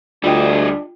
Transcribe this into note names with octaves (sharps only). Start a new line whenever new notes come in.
D2 G3 D4 F4 D#5 G5